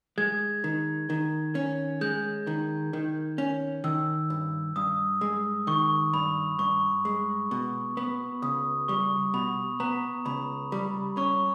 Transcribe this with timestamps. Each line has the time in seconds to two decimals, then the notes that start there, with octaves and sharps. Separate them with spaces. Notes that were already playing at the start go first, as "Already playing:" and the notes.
0.18 G#3 G#6
0.64 D#3
1.10 D#3
1.55 C#4
2.01 G#3 G6
2.47 D#3
2.93 D#3
3.38 C#4
3.84 D#3 E6
4.30 G2
4.76 G2 D#6
5.21 G#3
5.67 D#3 C#6
6.14 G2 B5
6.59 G2 C#6
7.05 G#3
7.51 B2
7.97 B3
8.42 C#2 D#6
8.88 G3 C#6
9.34 B2 B5
9.80 B3 A#5
10.25 C#2 B5
10.72 G3
11.17 C#4 C#6